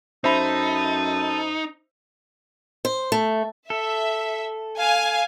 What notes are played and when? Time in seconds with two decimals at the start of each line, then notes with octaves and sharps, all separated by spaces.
0.24 F#2 D#4 A4 C5 E5 B5
2.85 C5
3.12 A3
3.70 A4 E5
4.79 F5 G#5